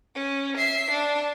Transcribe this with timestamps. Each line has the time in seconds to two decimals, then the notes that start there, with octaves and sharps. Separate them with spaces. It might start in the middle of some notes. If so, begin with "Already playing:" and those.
0.15 C#4
0.57 E5 C7
0.91 D4